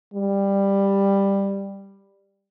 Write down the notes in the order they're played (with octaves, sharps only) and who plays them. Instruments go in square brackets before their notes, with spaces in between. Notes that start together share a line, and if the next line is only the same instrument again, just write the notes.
[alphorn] G3